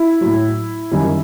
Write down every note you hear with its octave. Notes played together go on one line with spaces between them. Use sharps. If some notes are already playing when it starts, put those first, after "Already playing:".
Already playing: E4
A2 F#3
F#2 D#3 G3